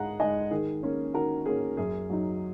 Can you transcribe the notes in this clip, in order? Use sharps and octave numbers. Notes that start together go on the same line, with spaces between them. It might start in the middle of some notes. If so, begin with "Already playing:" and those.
Already playing: G#2 G#3 G#4 D#5 F#5 A#5
G#3 D#4 D#5 G#5
D#3 G#4
A#3 C#4
D#3 F#4 A#4
A#3 C#4 G#4
F#2 G#4
F#3 D#4